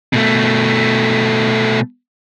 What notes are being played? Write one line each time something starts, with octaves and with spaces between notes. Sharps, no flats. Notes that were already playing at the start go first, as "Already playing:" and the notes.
B2 A3